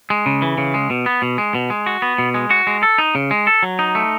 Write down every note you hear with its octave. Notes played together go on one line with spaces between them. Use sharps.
G#3
C#3
E3
C#3
G#3
B2
B3
B2
G#3
B2
G#3
F#4
B3
B2
G#3
F#4
G#3
A4
D#4
C#3
G#3
A4
F#3
D#4
A3